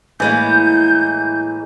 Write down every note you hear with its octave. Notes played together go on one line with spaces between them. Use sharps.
A2 E3 G#3 A#3 G6